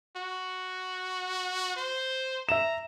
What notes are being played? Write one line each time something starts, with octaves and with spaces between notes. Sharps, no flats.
F#4
C5
E5 A#5 E7